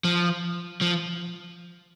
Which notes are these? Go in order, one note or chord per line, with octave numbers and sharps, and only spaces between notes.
F3
F3